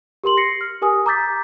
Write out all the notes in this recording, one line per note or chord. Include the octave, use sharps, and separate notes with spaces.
G4 A#4 C6 F#7
A#6 C7 C#7
F6
G4 A#4 G#5 D#6
A#5 D6 E6 G6 A6 B6